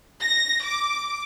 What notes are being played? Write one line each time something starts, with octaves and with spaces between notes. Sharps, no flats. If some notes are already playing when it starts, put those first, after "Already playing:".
A#6
D6